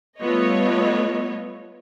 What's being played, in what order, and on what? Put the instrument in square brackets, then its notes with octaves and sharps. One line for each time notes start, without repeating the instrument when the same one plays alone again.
[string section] G3 A3 B3 F4 C#5 D#5